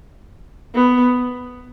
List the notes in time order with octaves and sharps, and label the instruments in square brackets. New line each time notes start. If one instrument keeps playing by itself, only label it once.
[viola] B3